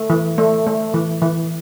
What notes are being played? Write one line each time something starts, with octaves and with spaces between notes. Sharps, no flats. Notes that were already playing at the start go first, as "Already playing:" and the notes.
Already playing: A3
E3
A3
A3
E3
E3